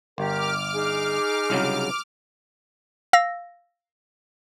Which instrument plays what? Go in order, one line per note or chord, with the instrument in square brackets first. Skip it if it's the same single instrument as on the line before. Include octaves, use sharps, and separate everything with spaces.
[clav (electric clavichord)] G1 [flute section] G4 A#4 [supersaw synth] D6 F6
[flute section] D#4 G#4 G#5
[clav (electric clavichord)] C2 C#3 F#3
[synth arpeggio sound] F5 E6 A#6